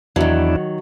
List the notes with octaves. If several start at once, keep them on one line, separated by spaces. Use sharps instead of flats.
E2 D#3 F#3 D4 E4